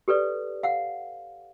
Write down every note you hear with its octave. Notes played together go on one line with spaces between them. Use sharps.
G4 A4 B4 D5
F5 F#5